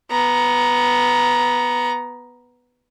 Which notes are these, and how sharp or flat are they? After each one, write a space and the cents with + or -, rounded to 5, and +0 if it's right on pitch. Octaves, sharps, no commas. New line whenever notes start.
B3 +0 A#5 +10